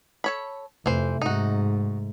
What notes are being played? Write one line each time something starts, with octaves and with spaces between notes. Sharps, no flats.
A4 C#5 B5
F2 C3 E3 A3 C5
G#2 D#4 F#4